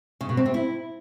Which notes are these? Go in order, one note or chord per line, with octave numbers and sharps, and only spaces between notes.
C#3
B2
C4
C3
E4